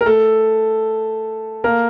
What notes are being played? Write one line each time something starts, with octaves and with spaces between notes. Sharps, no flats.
A#4
A3 A4
A#3 A#4